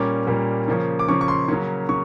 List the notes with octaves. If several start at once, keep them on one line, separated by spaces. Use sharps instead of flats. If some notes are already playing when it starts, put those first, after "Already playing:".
Already playing: A#2 G3 A#3 C#4 D6
A#2 G3 A#3 C#4
C#3 F3 A#3 C#4
D6
C#3 F3 A#3 C#4 C#6
C#6
C6
C#3 F#3 A#3 C#4
C#3 C#6